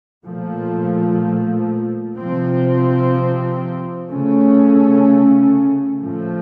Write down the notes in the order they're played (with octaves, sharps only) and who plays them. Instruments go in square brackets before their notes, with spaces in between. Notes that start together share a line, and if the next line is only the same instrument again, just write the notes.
[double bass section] A#2 F3 A3
C3 F3 C4
C#3 A3 C#4
A2 F3 A3